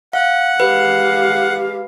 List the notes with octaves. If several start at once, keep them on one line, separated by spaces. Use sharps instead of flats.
F5 F#5
G#3 G4 B4 F5